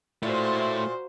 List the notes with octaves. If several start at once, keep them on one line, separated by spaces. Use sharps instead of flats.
A#2 A3 E4 F#4 C5